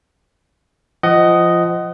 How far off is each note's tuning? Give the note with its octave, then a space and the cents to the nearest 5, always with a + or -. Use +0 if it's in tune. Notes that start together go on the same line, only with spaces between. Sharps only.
F3 -20 D#5 +0 F#5 +25